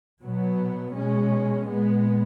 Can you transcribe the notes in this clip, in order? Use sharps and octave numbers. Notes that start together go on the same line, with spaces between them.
B2 F#3 B3
B2 G#3 C#4
A#2 G#3 B3